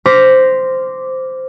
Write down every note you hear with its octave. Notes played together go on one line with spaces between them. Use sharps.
C5 D6 F6 A#6 B6